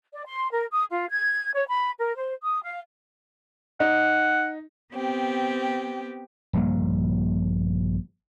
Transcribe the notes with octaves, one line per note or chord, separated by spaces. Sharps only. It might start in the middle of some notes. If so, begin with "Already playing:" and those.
D5
C6
A#4
D#6
F4
G#6
C#5
B5
A#4
C5
D#6
F5
D#4 F#5
B3 C4 G4
A#1 G2 D3 A#3